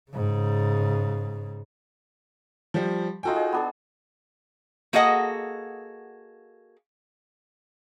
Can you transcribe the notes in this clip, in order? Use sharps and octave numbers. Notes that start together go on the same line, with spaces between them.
G#2 C#3
F3 G3
D#4 F4 F#4 A4 G5 G#5
G#4
B3 D4 G#4
A#3 F#4 G#4 A4 D#5 F#5